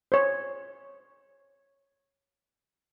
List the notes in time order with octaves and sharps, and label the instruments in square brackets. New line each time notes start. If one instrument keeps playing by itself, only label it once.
[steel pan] C5 C#5